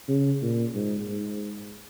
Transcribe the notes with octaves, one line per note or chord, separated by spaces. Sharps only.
C#3
A#2
G#2
G#2